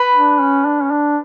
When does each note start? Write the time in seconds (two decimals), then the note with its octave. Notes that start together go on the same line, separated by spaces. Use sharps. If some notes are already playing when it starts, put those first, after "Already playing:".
Already playing: B4
0.14 D4
0.40 C#4
0.65 D4
0.83 C#4
0.91 D4